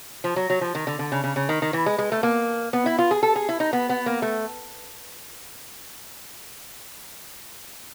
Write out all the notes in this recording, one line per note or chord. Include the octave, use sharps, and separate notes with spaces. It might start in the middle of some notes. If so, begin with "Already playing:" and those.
F3
F#3
F#3
F3
D#3
D3
D3
C#3
C#3
C#3
D#3
D#3
E3
G#3
G#3
A3
A#3
B3
E4
F4
G#4
A4
G#4
E4
D#4
B3
B3
A#3
A3